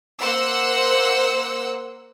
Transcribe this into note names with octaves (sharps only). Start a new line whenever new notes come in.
A#3 C5 F#5 E6